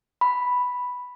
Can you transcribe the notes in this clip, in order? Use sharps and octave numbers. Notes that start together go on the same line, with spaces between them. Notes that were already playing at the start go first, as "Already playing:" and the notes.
B5